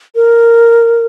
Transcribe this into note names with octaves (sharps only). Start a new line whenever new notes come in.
A#4